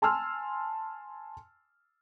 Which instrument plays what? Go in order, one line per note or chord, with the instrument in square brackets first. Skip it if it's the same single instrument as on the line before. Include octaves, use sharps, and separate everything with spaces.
[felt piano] G#5 A5 C6 E6 F6